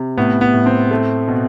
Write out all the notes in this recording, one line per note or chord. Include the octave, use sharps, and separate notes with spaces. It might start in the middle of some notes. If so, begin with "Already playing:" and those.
Already playing: C3
A2 B3
B3
A2
C4
A3
B2